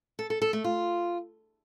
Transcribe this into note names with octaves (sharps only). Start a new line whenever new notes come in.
A4
A4
A4
A3
F4